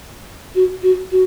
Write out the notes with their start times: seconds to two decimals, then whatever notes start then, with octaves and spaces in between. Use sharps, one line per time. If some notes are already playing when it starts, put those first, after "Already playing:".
0.55 F#4
0.82 F#4
1.11 F#4